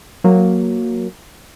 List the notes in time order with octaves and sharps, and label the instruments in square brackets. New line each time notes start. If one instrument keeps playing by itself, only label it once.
[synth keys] F#3 A#3